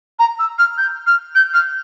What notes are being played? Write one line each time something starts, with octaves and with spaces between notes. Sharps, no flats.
A#5
E6
F6
G6
F6
G6
F6